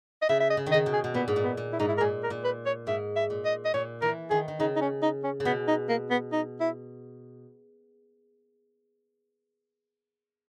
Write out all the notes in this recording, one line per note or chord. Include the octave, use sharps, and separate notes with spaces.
D#5
C#3 E5
E5
D#5
C#3
D#3 D#5
C#3
B2
G#4
B2
A#2 B3
G#2
A#2
B3
A#2
E4
G#2 D#4
E4
A#4
A#2 G#4
A#4
A#2
B4
C#5
G#2 E5
E5
A#2
D#5
D#5
A#2 C#5
E3 A#4
D#3 G#4
D#3
C#3 D#4
D#4
C#4
D#4
C#4
C#3
B2 B3
D#4
A#3
B3
D#4
E4